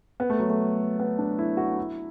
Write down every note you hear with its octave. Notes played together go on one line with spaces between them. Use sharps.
B3
A3
F#3
A3
B3
D4
E4
F#4
E4